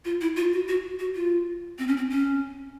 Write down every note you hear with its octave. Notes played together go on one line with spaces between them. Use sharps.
F4
E4
F4
F#4
F#4
F#4
F4
C4
C#4
C4
C#4